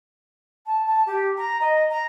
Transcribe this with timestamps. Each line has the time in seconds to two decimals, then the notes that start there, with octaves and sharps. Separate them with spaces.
0.66 A5
0.87 A5
1.06 G4
1.38 A#5
1.61 D#5
1.90 A#5